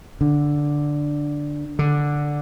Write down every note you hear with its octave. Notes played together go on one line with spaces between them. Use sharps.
D3
D3